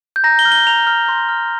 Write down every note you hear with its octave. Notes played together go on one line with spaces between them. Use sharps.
G6
A#5 A#6
G7
F6
G7
A#5 F7
F6
C6
F6